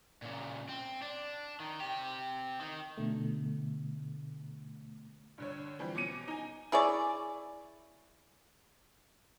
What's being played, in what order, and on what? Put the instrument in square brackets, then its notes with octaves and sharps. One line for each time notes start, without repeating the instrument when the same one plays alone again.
[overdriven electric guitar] A#2 C#3
C4
D4
D#3
C4 G4
D#3
[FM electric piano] B2 D3 A3
[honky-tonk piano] G2 D3 C#5
E3 F3 G3 C4
B2 C#4 D6 C#7 D#7
D#4 G#5
[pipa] E4 G#4 C#5 D5